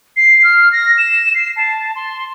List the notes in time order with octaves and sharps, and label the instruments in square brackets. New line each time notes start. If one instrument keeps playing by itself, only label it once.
[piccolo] C7
F6
A#6
E7
C7
A5
C6